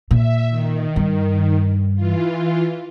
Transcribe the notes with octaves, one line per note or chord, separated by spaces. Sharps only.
A#2 E5
D#3
G2
E3 F4